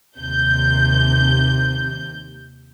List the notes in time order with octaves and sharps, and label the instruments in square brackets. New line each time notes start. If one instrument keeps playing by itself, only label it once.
[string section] D#2 C3 G6